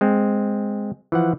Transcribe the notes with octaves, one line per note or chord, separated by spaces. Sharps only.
G#3 C4
E3 F3 F#5